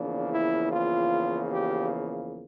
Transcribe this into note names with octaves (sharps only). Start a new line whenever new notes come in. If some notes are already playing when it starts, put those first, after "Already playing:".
Already playing: E2 C#3 F3 A#3 D4
E4
F4
G4